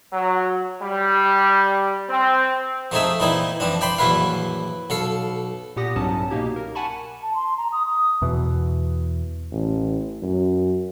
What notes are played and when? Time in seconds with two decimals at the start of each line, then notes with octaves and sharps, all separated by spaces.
0.12 F#3
0.81 G3
2.08 C4
2.92 F3 A3 C4 D#4 G#4 E5
3.20 A#2 E3 A#3 C4 D#4 E4
3.60 E3 F3 C4 D4
3.81 D5 G5 B5 C6
3.98 A#1 F#2 E3 E4 B4 F5
4.90 B1 A4 F5
5.76 A#2 B3 G4 F#5 D#6 A#6
5.96 C2 G#2 F#3 B3 C#4 A5
6.31 B2 A#3 D#4 G4 G#6
6.56 A#4
6.75 F#5 G#5 A5 B5 C#6
7.22 A5
7.35 C6
7.57 A#5
7.72 D#6
7.86 D#6
8.22 E2 B2 E3
9.52 A1
10.22 F#2